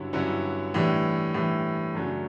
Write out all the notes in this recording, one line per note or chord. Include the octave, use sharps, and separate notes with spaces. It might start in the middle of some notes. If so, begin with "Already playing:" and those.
Already playing: G2 D3 F#3 C#4 E4
G2 D3 F#3 C#4 E4
A2 E3 G3 D4
A2 E3 G3 D4
F#2 C#3 F#3 A3 D4